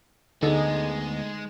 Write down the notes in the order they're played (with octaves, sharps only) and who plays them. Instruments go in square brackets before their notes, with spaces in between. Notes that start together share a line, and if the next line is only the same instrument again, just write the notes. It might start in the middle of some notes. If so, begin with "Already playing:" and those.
[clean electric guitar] D2 B3 [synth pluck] D3 A4 [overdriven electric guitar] G#3 [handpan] D#4 G#4